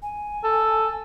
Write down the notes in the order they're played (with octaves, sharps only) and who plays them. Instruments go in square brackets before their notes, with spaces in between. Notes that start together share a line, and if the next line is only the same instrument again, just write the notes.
[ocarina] G#5
[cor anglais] A4